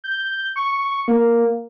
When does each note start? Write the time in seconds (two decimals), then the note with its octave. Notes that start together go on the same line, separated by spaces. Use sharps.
0.04 G6
0.56 C#6
1.08 A#3